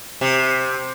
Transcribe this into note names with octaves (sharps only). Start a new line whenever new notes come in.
C3